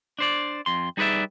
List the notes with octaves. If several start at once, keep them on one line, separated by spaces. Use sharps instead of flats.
D4 C5 D5
F2 C6
G3 D#4 G#4 B4 D5 E5